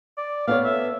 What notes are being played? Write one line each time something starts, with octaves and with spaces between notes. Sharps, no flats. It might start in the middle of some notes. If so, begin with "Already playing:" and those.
D5
B3 A4 C#5 F5
E5